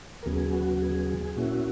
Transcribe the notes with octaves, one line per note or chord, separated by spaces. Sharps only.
A#4
D#2 C#3 F#3 B3 G#4
F#4
G#4
A#2 A#3 C#4 E4 F#4